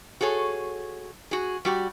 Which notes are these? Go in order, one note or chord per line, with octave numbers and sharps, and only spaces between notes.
F#4 G#4 A4 C#5
F#4 G#4
G3 F#4 G4